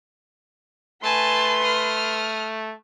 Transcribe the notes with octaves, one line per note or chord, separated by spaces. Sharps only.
A3 B4 G#5 A5 C6
D#6 F6